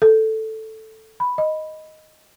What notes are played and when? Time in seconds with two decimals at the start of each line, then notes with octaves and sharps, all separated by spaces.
0.02 A4
1.20 B5
1.38 D#5